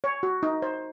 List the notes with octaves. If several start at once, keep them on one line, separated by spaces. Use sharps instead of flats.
C#5
F#4
D#4
C5